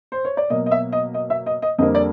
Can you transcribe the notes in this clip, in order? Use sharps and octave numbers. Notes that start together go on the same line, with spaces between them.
C5
C#5
D5
B2 F#3 A#3 D#5
D#5
E5
D#5
D#5
E5
D#5
D#5
F2 D3 G3 A#3 D#5
D5